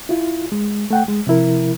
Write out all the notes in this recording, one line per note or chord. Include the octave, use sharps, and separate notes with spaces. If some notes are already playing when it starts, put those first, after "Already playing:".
E4 F4
G#3
A3 F#5 G5
G#3
C3 F3 E4 A#4